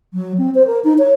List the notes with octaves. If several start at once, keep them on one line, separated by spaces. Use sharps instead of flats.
F#3
C4
C5
A#4
D#4
C#5